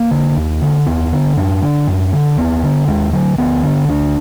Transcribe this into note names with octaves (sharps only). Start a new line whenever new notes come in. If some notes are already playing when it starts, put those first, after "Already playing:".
Already playing: A#3
D3
D#2
D3
D#2 B3
D3
F#2 D4
D3
F#2
D3
D#2 B3
D3
D#2 G#3
D3 F#3
D2 B3
D3
D2 D4